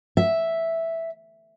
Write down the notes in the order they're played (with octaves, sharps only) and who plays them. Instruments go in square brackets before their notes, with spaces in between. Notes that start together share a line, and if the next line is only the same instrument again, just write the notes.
[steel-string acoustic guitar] E5